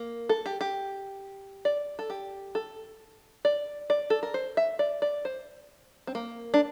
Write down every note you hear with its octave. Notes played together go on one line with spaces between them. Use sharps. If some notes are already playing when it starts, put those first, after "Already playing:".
Already playing: A#3
A4
G4
G4
D5
A4
G4
A4
D5
D5
A4
A#4
C5
E5
D5
D5
C5
C4
A#3
D4